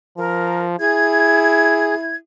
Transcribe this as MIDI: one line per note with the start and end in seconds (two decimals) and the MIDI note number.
0.17 0.79 53
0.17 0.66 70
0.80 2.17 64
0.80 1.95 68
0.80 2.16 92